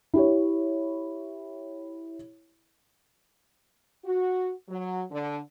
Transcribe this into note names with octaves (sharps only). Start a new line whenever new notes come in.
E4 G4 C#5
F#4
F#3
D3